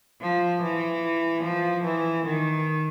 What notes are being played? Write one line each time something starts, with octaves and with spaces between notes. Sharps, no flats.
F3
E3
F3
E3
D#3